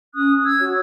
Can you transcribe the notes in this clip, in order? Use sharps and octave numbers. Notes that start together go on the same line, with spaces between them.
C#4 D#6 F#6
E6 G#6
F#4 C#5